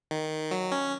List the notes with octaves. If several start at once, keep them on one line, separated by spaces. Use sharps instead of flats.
D#3
F#3
C#4